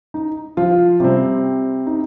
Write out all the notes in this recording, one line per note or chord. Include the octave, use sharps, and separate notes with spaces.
D#4
F3 F4
C3 G3 C4
D#4